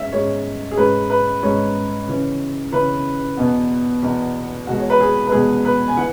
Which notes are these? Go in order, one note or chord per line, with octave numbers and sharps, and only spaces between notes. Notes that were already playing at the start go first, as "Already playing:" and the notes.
Already playing: G#2 G#3 C#4 E5
G#2 G#3 C#4 C#5
G#4
G#2 G#3 C#4 B4
B4
G#2 G#3 C#4 C#5
C#3 E3 C#4
C#3 E3 C#4 B4
E2 B2 B3
E2 B2 B3
E2 B2 G#3 F#4
C#5
B4
G#4
B4
E2 B2 G#3 G#4
B4
G#5
E3 F#5